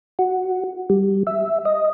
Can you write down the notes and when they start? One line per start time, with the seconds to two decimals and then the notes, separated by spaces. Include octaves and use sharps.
0.19 F#4
0.90 G3
1.27 E5
1.65 D#5